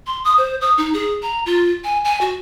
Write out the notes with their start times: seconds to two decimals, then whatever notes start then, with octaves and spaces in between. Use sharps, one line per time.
0.07 C6
0.25 D#6
0.38 C5
0.61 D#6
0.78 D#4
0.94 G#4
1.22 A#5
1.46 F4
1.84 G#5
2.05 G#5
2.21 F#4